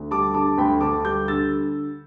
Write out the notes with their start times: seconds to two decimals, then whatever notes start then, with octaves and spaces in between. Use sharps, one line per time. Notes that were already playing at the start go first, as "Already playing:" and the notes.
Already playing: D2
0.11 G3 A5 D6
0.34 D3 A5 D6
0.58 D2 G5 B5
0.81 D2 A5 D6
1.05 G3 D6 G6
1.28 D3 E6 A6